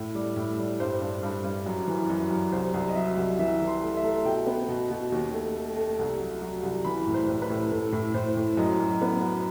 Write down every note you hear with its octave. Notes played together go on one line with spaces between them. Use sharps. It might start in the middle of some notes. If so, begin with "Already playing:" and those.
Already playing: A2
G3
A2
G3
G2 C5
G2
G2
G2
F#2
E3
F#2
F#2
C2 C5
C2
D#5
F#3 E5
C2
E3 E5
E3
C6
A3
E5
A3
B2 G5
B3
B2
B2
D#2
A3
A3
A3
C2
F#3
F#3
C2
E3 B5
A2
C5
A2
B4
A2
A2 A4
A2
A2 C5
A2
F#2 D#5
F#2
B3
F#3